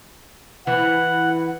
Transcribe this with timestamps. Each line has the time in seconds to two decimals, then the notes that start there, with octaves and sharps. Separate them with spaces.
0.67 E3 F#5